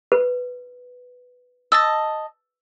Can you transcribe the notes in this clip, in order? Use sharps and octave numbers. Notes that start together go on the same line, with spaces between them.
B4
D#5 A5 E6 A6